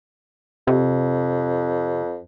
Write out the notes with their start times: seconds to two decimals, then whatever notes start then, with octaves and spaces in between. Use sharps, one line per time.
0.67 F2 C3